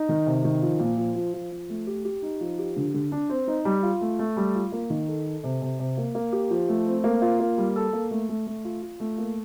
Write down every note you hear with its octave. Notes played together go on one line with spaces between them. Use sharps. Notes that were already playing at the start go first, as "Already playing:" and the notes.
Already playing: D#4
D#3
C3
D#3
F3
A#2
F3
F3
F3
F3
A3
G4
G4
D#4
F3
G4
D3
D3
D4
C4
D#4
G3
F4
A3
A3
G3
F4
A#3
D#3
A4
A4
C3
C3
C3
A#3
A#3
G4
F3
A3
C4
A#3
F4
A#3
G3
A4
A#3
A3
A3
A3
F4
F4
A3
A#3